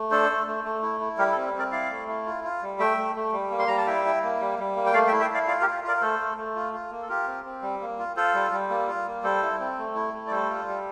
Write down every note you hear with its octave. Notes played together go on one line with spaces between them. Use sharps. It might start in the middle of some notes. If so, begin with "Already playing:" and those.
Already playing: A3
D4 A4 C5
A3
A3
A3
E4
E4
G3 G4 A#4
A4
C4
C4
A#4 D5
E4 D5 F5
A3
E4
F4
F4
G3
A3 E5 G5
A3
A3
G3
A#3
C6
G3 A#5
A5
E4 E5 G5
E4
A#3
G3
G3
A#3
G5
A3 D5 F5
E5 G5
E4
E5 G5
E4 D5 F5
F4 D5 F5
G4 A#4
F4
F4 A#4 D5
A#4
A3 A4 C5
A3
A3
F4
F4
A#3
A4
F4 G4 A#4
C4
C4
G3
A#3
F4
F4 A4 C5
G3
G3
A#3
F4
A#3
G3 A4 C5
E4
C4
A3
E4
A3
D5
G3 A4 C5
F4
G3